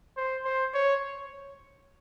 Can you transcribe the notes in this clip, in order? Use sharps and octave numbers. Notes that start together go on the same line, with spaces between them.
C5
C5
C#5